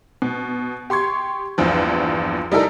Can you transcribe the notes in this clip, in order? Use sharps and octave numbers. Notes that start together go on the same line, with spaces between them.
B2
G4 C6 C#6 G#6
A#1 E2 G2 F3
G3 D#4 E4 A4 A#4